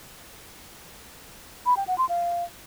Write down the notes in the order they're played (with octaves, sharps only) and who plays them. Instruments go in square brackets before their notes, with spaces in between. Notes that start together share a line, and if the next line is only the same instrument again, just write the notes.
[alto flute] B5
G5
F#5
C6
F5